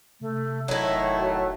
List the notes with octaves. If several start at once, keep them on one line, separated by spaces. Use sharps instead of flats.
C3 A3
F1 A2 D#3 F#3 A3 E4 D#5
F#4